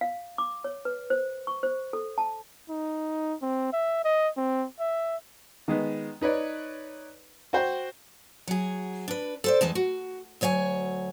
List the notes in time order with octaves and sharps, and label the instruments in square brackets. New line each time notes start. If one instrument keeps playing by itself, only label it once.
[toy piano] F5
D6
C#5
B4
C5
C#6
C5
A4
A5
[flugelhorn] D#4
C4
E5
D#5
C4
E5
[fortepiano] D#3 G#3 B3
D#4 B4 C#5 D5
F#4 C5 G5
[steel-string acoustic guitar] F#3 G#4
D4 B4
A4 C5 D5
E2 E3 G#3 A5
F#4
D2 F#3 C#5 D#5 G#5